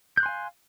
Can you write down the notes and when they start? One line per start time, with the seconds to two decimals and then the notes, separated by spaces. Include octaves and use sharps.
0.17 G6
0.20 F#6
0.23 C6
0.26 G#5
0.29 F5